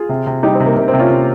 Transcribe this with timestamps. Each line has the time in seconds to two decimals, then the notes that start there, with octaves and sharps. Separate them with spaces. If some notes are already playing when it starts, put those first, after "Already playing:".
Already playing: F4 G#4
0.09 C3
0.27 C3
0.43 G3 D#4 G4
0.55 C4
0.60 C3
0.66 A#3
0.77 C3 A#3
0.88 C4
0.94 C3
0.99 C#4 F4
1.10 C3